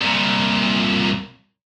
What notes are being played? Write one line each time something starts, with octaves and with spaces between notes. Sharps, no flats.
C2 A#2